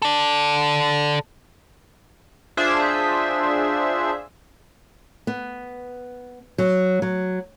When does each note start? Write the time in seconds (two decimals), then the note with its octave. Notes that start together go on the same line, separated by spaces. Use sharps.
0.02 A4 D5
2.57 D4 F4 G#4 C5 E5
5.27 B3
6.58 F#3
7.02 F#3